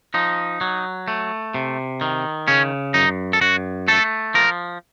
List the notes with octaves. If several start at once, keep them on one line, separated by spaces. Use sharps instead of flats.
F3 D#4
F#3
A3
C3
D#3
C#3 C#4
F#2 D#4
A4
F#2 F#4
A3 A4
F3 A#4